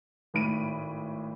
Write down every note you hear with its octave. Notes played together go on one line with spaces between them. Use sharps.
G#1 A2 B5 D7 D#7